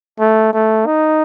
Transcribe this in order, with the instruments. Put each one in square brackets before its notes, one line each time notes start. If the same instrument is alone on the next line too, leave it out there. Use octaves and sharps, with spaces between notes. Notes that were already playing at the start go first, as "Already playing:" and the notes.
[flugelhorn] A3
A3
D#4